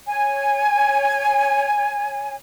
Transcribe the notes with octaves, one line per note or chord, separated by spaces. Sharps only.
C#5 G#5